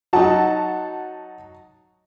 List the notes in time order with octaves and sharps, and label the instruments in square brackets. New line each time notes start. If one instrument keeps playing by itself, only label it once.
[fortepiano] F#3 D#4 [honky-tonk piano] F#4 F#5 A5